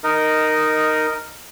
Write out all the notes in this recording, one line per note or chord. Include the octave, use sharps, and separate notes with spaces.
D#4 A#4 D#5